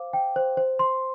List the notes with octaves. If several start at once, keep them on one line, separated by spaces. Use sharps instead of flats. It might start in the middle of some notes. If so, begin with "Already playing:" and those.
Already playing: C5 F5 D6
G5
C5
C5
C6